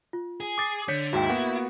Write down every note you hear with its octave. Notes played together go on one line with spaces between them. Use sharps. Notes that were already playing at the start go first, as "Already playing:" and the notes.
F4
G#4
D6 D#6 A6 C7
D3 C#5 G6 B6 C#7
D#2 G#2 E4 F#4 G5
A#3 B3 F#4 F#5